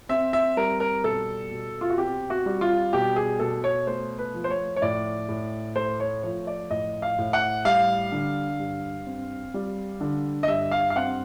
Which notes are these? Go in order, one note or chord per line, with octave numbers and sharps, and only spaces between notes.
C4 E5
E5
G3 A#4
A#4
B2 A4
B2
F4
F#4
C4 G4
F#4
G3
F4
B2 G4
G#4
B2 A4
C#5
A3 C5
B4
F3
C5
C#5
C#5
A2 D5
A2
A3 C5
C#5
F3 C#5
D5
A2 D#5
F5
A2
F#5
G3 F5
D3
G2
C4
G3
D3
D#5
G2 E5
F5
F5
C4 F#5